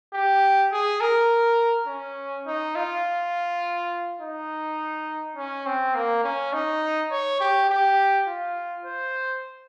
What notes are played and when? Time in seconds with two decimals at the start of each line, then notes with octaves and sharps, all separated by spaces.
0.13 G4
0.72 G#4
1.01 A#4
1.87 C#4
2.46 D#4
2.76 F4
4.21 D#4
5.37 C#4
5.66 C4
5.95 A#3
6.24 C#4
6.53 D#4
7.11 C#5
7.41 G4
7.70 G4
8.28 F4
8.85 C5